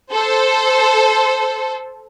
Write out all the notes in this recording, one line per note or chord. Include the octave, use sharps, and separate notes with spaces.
A4 C5